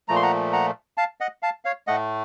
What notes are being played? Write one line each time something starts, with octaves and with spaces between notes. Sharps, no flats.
A#2 F3 A3 A#5
C6
F#5 A#5
F#5 A#5
F5 A5
D#5 F#5
F5 A5
C#5 F5
A2 A3 D#5 F#5